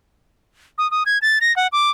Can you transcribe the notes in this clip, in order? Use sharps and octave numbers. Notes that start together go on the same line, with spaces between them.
D#6
D#6
G#6
A6
A#6
F#5
D6